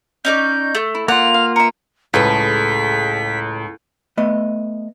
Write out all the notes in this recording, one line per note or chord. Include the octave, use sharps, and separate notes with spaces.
C#4 D#4 D5 G6
A3
E4
A#3 F4 D5 F#5 F7
F5
A#4 E5 C#7
C#2 A2 G#3 A4 B4 B6
A3 B3 D#5